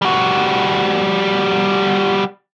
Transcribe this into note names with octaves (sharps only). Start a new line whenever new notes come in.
G3 F#4